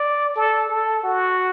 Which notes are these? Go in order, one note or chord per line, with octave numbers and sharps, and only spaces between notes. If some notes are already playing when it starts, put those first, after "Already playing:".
Already playing: D5
A4
A4
F#4